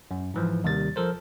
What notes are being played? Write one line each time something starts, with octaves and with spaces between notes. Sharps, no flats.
F#2
G#2 E3 F3
D#2 C3 D#3 G3 A6
F3 A4 A#4 C5